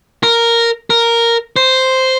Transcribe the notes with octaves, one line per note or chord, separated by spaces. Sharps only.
A#4
A#4
C5